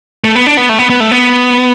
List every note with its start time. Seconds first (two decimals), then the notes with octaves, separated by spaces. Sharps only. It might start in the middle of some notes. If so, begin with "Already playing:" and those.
0.24 A3
0.35 B3
0.47 D4
0.57 B3
0.69 A3
0.79 B3
0.90 B3
1.00 A3
1.11 B3